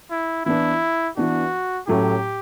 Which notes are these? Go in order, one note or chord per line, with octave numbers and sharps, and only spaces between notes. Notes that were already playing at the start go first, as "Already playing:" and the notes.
E4
E3 B3 D4 E4
E3 B3 D4 F#4
A2 F#3 A3 C#4 E4 G4